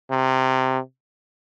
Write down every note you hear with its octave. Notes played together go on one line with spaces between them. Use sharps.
C3